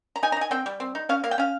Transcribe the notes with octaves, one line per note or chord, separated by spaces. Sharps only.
A#5
D#4 G#5
A#5
D#4 G#5
C4 G5
G3
C4
D#4
C#4 F5
A#3 F5
G5
C#4 F5